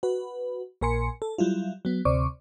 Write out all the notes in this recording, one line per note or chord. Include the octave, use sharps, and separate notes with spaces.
F#4 B4
A#1 A#2 A#4 G#5 C6 C#7
A4
F#3 G3 E4 F4
F#3 B3
D2 C3 C5 D5 C#6 D6